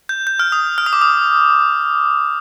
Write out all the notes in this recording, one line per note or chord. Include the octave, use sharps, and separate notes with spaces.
G6
G6
F6
D#6
F6
D#6
D6
D#6